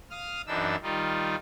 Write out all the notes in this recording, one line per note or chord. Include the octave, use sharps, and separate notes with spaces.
F5 D#6 F6
F#2 E3 D4 D#4 E6
D#3 G3 D#4 F4